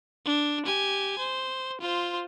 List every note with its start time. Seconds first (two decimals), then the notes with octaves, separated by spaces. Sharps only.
0.25 D4
0.66 G4 G#5
1.18 C5
1.81 F4 C5